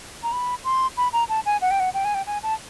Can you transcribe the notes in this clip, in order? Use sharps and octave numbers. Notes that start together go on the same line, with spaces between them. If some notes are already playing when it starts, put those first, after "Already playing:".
A#5
B5
C6
B5
A#5
A5
G#5
F#5
G5
F#5
G5
G#5
G5
G#5
A5